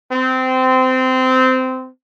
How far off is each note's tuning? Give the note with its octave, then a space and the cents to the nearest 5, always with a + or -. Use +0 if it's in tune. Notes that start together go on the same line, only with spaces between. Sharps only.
C4 -20